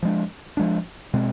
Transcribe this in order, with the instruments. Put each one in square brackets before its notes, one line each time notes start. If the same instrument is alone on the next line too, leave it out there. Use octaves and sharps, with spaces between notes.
[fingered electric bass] F3 G#3 D4
F3 G#3 D4
B2 G#3 C4